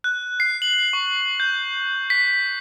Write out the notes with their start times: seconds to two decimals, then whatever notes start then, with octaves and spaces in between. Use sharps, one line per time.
0.04 F#6
0.40 C7
0.62 F#7
0.93 C#6
1.40 G6
2.10 B6